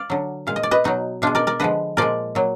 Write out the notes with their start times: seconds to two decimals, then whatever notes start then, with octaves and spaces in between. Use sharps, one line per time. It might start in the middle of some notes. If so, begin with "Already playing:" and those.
Already playing: D5 F5
0.10 D3 F#3
0.47 A#2 G#3 F5
0.56 D#5
0.63 D5
0.71 B4 D#5
0.84 B2 F#3 D#4 F#4
1.22 B2 G#3 D4 F4
1.35 A#4 D5
1.47 A#4 D5
1.60 D3 F3 G#3 B4 D#5
1.97 A#2 F3 G#3 A#4 D5
2.35 A#2 F#3